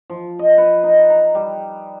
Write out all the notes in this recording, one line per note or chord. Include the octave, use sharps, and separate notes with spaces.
F3
D#5
B4
D#4
A#5
G3